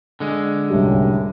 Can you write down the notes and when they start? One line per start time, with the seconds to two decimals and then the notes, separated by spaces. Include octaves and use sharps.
0.20 D3 G#3
0.70 C2 F#2 A2 G3